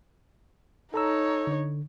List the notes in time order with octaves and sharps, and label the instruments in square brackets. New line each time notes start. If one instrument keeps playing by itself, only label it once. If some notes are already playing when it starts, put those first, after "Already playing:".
[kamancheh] D#4 C#5 [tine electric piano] A4 A#5 E6
[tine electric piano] D3